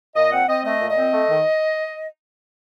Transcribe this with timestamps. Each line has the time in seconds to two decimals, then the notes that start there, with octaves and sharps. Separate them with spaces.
0.16 A#2 D#5
0.32 C4 F#5
0.48 C4 D#5
0.65 A3 D#5
0.80 A#2
0.90 D#5
0.97 C4
1.13 A3
1.30 D#3